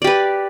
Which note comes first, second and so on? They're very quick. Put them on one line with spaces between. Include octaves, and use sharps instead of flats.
D5 G4 B4